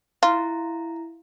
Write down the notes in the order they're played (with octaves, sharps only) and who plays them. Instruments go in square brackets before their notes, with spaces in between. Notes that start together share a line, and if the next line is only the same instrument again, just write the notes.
[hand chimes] E4 A#5 [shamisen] F4